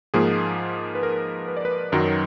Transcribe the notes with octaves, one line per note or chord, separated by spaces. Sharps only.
G#2 F3 A#3 G#4
B4
A#4
B4
D5
B4
F#2 D#3 F#3 A#4